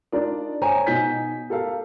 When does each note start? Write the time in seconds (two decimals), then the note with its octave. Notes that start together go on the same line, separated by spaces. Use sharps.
0.12 D4 D#4 F4 A#4 D5
0.62 C5 C#5 G5 G#5 A#5
0.87 B2 D#4 G#5 G6 B6
1.50 G4 A4 A#4 F5